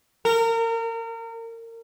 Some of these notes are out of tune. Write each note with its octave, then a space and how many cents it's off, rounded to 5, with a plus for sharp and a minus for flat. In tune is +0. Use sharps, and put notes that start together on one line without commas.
A#4 -30